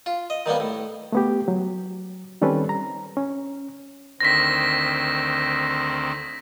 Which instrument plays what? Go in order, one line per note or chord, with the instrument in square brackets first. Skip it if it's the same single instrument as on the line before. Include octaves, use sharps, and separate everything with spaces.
[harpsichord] F4
D#5
D#3 G3 A#3 B3
A2
[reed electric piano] A3 B3 G4
F#3
D#3 G3 C4 C#4 A4 B4
A#5
C#4
[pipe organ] D2 D#3 C4 [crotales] A#6 B6